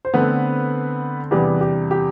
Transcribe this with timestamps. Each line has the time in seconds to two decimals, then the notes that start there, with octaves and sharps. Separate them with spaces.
0.05 C5
0.14 D3 A3 B3 C4 B4
1.31 E2 C3 G3 B3 D4 B4
1.61 G4
1.91 G4